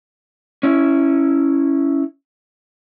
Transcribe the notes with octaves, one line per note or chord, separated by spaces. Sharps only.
C#4 E4